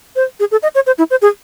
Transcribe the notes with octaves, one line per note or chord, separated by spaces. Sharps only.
C5
G#4
A4
D#5
C#5
C5
E4
C5
G#4